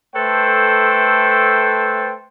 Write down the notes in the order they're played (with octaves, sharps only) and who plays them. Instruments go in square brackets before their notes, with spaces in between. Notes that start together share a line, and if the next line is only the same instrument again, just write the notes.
[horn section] A3 A4 B4 C5 G5